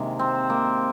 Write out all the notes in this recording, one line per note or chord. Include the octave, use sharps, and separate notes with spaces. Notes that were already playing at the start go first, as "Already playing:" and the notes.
Already playing: C3 D#3 G#3 A#3
C4
A#3